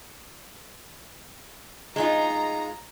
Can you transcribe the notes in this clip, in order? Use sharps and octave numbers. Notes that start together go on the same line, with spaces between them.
G#3 D#4 F4 A#5